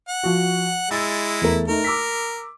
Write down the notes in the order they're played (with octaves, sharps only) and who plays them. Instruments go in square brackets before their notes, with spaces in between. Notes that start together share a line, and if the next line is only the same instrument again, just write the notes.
[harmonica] F#5
[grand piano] F3 F#4
[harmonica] G#3 E4 [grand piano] E6 A6
[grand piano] E2 A3 A#4
[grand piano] A3 D#4 [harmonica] A#4
[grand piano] D6 E6 B6